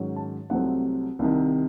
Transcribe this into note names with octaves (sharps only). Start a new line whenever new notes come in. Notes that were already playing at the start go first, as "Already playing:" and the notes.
Already playing: G#2 D#3 F#3 C#4
A5
C2 C3 F#3 A3 C4 F#5
C2 C3 D#3